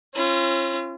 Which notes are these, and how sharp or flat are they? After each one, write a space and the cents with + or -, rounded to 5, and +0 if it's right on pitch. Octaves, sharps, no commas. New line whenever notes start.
C#4 -40 F4 -35